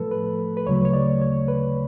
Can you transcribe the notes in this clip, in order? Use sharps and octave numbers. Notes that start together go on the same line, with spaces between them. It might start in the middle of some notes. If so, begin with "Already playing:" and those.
Already playing: A2 F3 A3 A4 B4
B4
B4
D2 C#3 F#3 A3 C#5
C#5
D5
C#5
B4